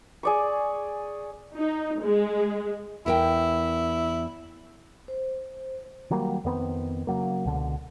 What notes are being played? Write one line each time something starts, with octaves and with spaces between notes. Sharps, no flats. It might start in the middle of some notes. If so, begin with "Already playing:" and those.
G#4 D5 C#6
D#4
G#3
E2 E4 A#4 G5
C5
D#3 F#3 G3 A#3
F2 D#3 B3 C4
C#3 F#3 A#3
C#2 B2 D3